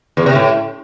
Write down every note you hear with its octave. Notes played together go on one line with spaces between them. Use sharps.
E2
C3
A2